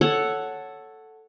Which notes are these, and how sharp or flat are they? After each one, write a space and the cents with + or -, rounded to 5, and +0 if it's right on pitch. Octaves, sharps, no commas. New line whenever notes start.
A4 +0 C#5 +0 F#5 +0